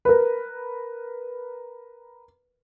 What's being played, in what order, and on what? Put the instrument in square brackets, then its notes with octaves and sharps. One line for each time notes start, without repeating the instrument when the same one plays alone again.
[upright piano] A#4 B4